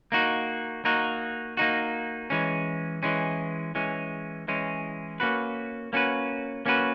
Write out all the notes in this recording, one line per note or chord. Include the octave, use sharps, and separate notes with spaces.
A#3 D#4 F#4
A#3 D#4 F#4
A#3 D#4 F#4
E3 G#3 C#4
E3 G#3 C#4
E3 G#3 C#4
E3 G#3 C#4
A#3 C#4 F#4 B4
A#3 C#4 F#4 B4
A#3 C#4 F#4 B4